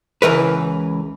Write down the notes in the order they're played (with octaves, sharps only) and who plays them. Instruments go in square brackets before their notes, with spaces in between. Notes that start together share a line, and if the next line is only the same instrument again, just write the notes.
[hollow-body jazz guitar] C#2 E3 A#4 B4